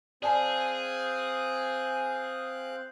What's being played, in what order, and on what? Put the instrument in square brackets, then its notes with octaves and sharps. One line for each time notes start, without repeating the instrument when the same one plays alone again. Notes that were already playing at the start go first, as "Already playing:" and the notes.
[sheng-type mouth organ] C4 F5 F#6 [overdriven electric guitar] G#4 [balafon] D5 G#5 A5